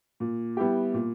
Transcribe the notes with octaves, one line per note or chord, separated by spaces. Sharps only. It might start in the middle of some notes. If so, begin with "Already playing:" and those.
A#2
G3 B3 E4 G4
A#2